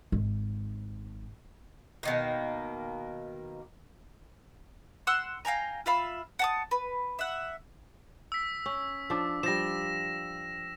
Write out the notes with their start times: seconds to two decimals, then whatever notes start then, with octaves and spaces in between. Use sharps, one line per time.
0.12 G#1
2.03 B2 D#3 A#3
5.07 F#5 C6 E6 F#6
5.45 F5 G5 G#5 A#5
5.86 F4 E5 F5 B5
6.39 F#5 A5 D#6
6.71 B4
7.19 E5 F#5
8.32 E6 B6
8.66 C#4
9.10 F3 D4
9.43 F3 G3 A#6 E7